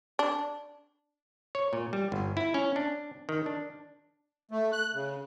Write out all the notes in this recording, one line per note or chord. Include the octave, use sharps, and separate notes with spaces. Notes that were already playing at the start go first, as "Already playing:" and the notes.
D4
C#5
A#2
G3
G1
E4
C#4
D4
D#3
D4
A3
F#6
C#3